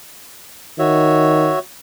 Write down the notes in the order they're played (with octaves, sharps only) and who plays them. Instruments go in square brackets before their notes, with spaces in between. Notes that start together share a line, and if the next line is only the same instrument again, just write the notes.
[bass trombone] D#3 [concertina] F#4 C#5 E5